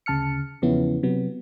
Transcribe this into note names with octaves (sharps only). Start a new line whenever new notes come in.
D2 C#3 A5 F6 C#7
E2 C#3 F3 B3 C#4 E4
C3 F#3 B3